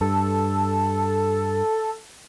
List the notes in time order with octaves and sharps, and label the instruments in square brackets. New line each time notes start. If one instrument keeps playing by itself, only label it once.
[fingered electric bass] G2 [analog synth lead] A4